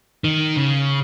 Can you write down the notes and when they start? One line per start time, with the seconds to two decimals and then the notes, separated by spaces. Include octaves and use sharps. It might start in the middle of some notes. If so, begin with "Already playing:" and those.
0.24 D#3
0.57 C#3